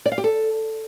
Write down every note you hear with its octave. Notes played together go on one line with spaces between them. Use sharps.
D5
F5
G4
A4